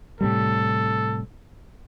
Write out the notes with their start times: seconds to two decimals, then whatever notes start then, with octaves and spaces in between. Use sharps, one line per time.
0.21 A2 C3 G3 A4